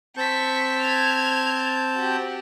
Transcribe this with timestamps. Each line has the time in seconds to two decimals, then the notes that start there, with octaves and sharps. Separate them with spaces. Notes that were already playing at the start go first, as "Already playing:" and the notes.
0.17 C4 A5 C#6 G6 B6
0.83 F6 G#6
1.95 F#4 G4